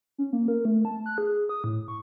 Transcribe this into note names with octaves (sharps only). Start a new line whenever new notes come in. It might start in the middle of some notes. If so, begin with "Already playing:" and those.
C#4
A#3
A#4
A3
A5
F#6
G#4
D#6
A2
C#6